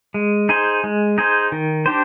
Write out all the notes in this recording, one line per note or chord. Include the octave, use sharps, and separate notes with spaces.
G#3
D#4 G#4 C5
G#3
D#4 G#4 C5
D#3
D4 G4 C5